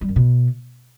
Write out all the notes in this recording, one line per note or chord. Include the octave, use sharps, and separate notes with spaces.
G3
F#2
B2